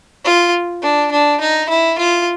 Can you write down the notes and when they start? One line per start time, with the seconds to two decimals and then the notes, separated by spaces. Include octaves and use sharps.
0.25 F4
0.82 D4
1.12 D4
1.41 D#4
1.70 E4
1.98 F4